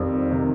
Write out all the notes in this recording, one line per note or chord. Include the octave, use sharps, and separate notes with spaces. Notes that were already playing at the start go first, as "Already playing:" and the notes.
Already playing: F2 D#3 G3 C4
C3 D#3